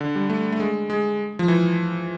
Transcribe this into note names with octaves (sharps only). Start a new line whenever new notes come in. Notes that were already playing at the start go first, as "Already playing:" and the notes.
D3
G3
A3
A3
G#3
G#3
F3
E3